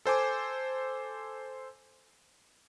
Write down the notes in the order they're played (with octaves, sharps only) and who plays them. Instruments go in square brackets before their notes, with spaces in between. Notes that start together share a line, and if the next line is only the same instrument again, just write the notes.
[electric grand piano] A4 C5 G#5 D6